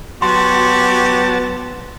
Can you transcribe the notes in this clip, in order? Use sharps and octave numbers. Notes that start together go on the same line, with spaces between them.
F#3 B3 F#4 G4 A5 C6